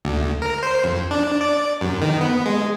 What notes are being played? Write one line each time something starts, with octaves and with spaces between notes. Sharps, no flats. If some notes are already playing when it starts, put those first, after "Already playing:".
D2
A#4
C5
F2
D4
D5
F#2
D#3
B3
G#3